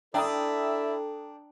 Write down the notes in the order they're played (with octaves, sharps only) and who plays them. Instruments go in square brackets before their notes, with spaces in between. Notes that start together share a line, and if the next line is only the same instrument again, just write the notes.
[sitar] D4 [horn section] E4 D5 E5 [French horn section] A4 [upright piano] G5 A#5 D#6